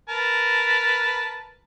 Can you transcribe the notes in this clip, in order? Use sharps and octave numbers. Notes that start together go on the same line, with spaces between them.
A#4 B4 A5